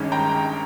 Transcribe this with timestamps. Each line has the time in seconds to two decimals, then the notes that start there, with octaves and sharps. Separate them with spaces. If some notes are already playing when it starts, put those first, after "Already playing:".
Already playing: G#1 G2 D#3 G#3 C#4
0.12 G5 A#5